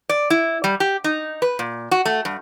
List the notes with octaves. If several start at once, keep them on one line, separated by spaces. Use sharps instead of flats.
D5
E4
G3
G4
D#4
B4
A#2
F#4
A3
G2